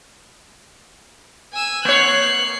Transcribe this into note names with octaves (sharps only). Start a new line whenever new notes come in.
G#5 E6
A#3 C#5 F#6 C7